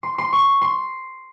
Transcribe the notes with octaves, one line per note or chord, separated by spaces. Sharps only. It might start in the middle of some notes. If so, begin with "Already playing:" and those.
C6
C6
C#6
C6